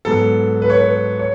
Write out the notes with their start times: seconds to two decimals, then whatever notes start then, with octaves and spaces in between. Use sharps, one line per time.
0.05 G#2 F#3 B3 A4
0.62 B4
0.70 C#5
0.77 B4
1.19 C#5